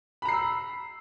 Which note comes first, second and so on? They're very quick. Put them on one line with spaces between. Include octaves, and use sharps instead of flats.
B5 A#5 C7 E6